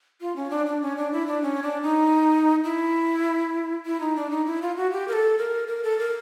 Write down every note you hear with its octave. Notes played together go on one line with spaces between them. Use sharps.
F4
C#4
D4
D4
C#4
D4
E4
D4
C#4
D4
D#4
E4
E4
D#4
D4
D#4
E4
F4
F#4
G4
A#4
A4
A#4
A#4
A4
A#4